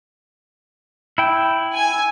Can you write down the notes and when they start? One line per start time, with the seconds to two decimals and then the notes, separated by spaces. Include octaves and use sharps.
1.18 E4 G5
1.74 G#5